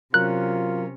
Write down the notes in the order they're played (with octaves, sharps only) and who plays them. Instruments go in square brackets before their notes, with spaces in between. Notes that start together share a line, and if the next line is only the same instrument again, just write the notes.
[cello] C3 C#4 [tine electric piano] F#3 A#4 [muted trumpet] F4 [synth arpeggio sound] F#6